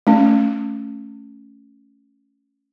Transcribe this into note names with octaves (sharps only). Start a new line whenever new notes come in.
A3 C#4